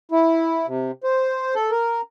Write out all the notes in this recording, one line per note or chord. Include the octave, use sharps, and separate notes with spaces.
E4
C3
C5
A4
A#4